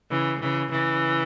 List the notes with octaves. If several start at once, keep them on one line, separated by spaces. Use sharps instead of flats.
C#3 E3
C#3 E3
C#3 E3